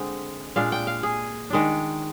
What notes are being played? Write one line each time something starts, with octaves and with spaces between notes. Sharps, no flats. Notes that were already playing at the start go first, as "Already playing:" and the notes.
Already playing: D3 G#3 C4
A#2 G#3 D4 F5
G5
F5
G#4
D#3 G#3 D4